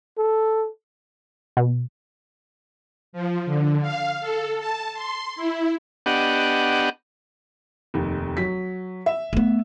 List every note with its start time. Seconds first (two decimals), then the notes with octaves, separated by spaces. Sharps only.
0.18 A4
1.57 B2
3.13 F3
3.46 D3
3.81 F5
4.20 A4
4.58 A5
4.94 C6
5.36 E4
6.06 B3 D4 G4 D#5 F#5
7.94 F1 D#2
8.37 F#3 B6
9.06 E5
9.33 A3 B3